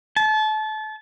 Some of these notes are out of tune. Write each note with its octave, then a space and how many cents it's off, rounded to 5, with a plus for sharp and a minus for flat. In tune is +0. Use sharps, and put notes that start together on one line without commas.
A5 -30